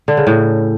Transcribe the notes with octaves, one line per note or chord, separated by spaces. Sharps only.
D3
C#3
A2